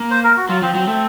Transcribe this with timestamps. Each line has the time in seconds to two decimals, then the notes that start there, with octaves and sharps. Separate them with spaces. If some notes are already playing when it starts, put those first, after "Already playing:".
Already playing: A#3
0.11 C5
0.24 A#4
0.37 F#4
0.49 F#3 F4
0.62 F3 C4
0.75 F#3 C4
0.87 A3 C4